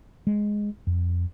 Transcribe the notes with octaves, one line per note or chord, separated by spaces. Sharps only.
G#3
F2